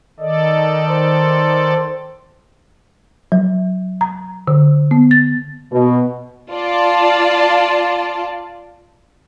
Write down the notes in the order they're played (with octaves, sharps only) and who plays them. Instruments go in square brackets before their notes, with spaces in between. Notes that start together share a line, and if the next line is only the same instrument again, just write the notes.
[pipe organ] D#3 A4 D5 [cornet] D#5
[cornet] C5
[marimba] F#3
A#5
D3
B3
A6
[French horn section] B2
[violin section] F4 D5 A5